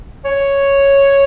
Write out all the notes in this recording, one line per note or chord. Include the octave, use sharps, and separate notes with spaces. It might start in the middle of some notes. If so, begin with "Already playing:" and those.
C#5